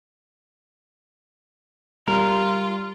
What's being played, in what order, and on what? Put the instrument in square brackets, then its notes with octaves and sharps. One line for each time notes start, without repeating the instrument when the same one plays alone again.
[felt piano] G3 [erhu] F4 [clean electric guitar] A#4